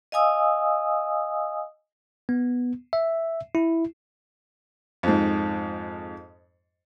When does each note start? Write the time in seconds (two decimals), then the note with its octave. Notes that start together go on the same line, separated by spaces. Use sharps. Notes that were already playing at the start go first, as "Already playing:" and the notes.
0.12 D#5 F5 G#5 D#6 E6
2.29 B3
2.93 E5
3.55 E4
5.03 F2 G#2